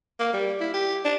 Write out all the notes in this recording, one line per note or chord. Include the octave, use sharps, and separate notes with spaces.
A#3
G3
E4
G4
D4